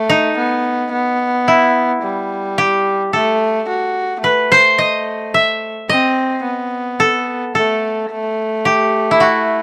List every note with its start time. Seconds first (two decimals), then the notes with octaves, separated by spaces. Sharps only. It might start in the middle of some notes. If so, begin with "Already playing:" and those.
Already playing: A3
0.10 D#4
0.37 B3
0.92 B3
1.48 E4
2.03 G3
2.58 G4
3.13 A3 A4
3.68 F#4
4.23 A3 B4
4.52 C5
4.78 D#5
5.34 E5
5.89 C4 D#5
6.45 B3
7.00 A4
7.55 A3 A4
8.11 A3
8.65 G4
9.11 E4
9.20 F#4